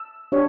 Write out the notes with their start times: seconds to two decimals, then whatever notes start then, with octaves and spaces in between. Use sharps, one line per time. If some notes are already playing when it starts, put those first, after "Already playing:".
Already playing: E6
0.32 D4 G4 C#5